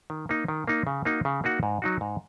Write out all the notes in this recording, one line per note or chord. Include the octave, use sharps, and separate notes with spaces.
D#3
A#3 D#4
D#3
A#3 D#4
C#3
A#3 D#4 F#4
C#3
A#3 D#4 F#4
G#2
F#3 D#4 F#4
G#2